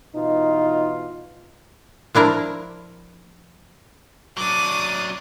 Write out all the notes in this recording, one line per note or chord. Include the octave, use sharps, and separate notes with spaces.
B2 E3 D#4 F4
F3 D4 E4 A#4
F#3 D4 D6 D#6